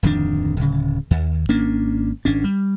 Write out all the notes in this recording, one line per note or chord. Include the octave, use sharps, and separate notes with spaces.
D1 F2 D#3 D4
D1 C#3
D#2
G#1 A#3 C#4 D4
G#1 C#4 D4
G3